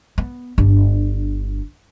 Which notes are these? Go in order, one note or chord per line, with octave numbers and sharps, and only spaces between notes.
B3
G1 D4